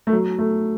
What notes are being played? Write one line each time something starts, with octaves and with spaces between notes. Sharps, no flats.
A3
F#3
A3